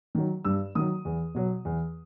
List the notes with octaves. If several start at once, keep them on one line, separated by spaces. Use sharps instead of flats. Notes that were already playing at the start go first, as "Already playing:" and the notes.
D#3 F#3
G2 E6
D#3 F#3 D#6
E2
B2 F#3
E2